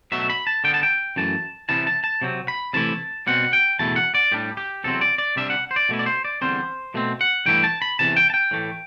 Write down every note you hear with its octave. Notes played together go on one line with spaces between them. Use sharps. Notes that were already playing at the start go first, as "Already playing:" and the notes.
B2 F#3 A3 E5
B5
A5
D3 G3 B3 G5
A5
G5
F#2 E3 A3 A5
C3 E3 G3 B3 E4 A5
A5
A5
C3 F#3 C4
B5
C3 E3 A3 E4 A5
B2 G3 C4 F#5
G5
E2 B2 A3 E4 A5
F#5
D5
A2 G3 D4 G4
G4
E2 C3 F#3 C4 A4
D5
D5
C3 G3 D4 E5
F#5
C5
D5
B2 A3 E4
D5
C5
D5
E2 D3 G3 C4 C5
B2 A3 C4
F#5
G2 E3 A3 E4 G5
A5
B5
E2 C3 E3 A5
G5
A5
G5
A2 E3 A3